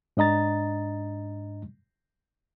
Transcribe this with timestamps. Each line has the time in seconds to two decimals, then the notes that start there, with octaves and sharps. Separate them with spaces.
0.17 G#2 D4 D#5 A#5 A6